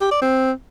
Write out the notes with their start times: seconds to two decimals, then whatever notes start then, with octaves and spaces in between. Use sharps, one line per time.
0.01 G4
0.11 D5
0.22 C4